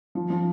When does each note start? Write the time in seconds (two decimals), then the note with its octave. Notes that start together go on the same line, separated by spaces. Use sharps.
0.15 F3
0.30 F3